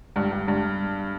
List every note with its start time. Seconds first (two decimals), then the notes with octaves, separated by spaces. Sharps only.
0.16 G2
0.31 G2
0.48 G2